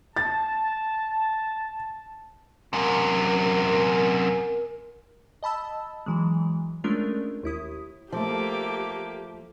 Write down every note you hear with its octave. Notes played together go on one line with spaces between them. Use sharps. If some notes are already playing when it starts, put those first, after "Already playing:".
A5 A6
F#2 C3 A#4
D#5 A5 B5 E6
E3 F#3 G#3
G#3 A3 C#4 D4 F4 A#4
D#2 E4 D#6
F3 A3 A#3 G4 A4 D6